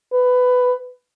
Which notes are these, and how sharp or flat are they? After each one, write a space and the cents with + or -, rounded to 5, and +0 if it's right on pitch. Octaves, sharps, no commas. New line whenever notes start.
B4 +15